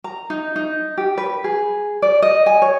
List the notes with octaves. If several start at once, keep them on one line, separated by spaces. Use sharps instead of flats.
A#5
D#4
D#4
G4
B4
G#4
D5
D#5
G#5
C#5